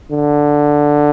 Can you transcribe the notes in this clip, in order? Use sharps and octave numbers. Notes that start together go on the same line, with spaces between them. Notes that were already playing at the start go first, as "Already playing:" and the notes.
D3